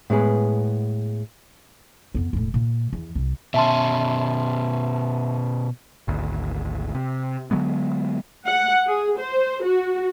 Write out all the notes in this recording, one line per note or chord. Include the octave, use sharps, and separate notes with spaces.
A2 G#3 B3 G#4 B4
F2 B3
E1 A2
A#2
E2
C2
B2 C#4 E5 A5 C6
G#1 D2
C3
D3 F#3 G#3 B3
F#5
G#4
C5
F#4